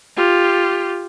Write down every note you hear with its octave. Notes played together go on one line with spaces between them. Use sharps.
F4 G4